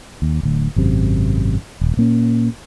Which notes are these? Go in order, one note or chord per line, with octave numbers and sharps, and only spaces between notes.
D#2
D1 D2
G#1 F#2 C3
D#1
A#2 A#3 C#4